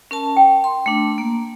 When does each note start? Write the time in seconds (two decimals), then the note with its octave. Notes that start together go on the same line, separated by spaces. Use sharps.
0.11 C#4 A#4 A5
0.37 G5
0.64 C6
0.86 A3 D4
1.18 A#3